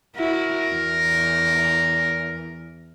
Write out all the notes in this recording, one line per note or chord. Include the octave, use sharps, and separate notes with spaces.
E4 F#4 A#4
E2